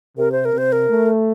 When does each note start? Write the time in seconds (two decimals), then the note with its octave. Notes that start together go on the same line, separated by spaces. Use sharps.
0.18 C3 A#4
0.32 C5
0.45 A#4
0.54 C3 C5
0.72 A#4
0.90 A3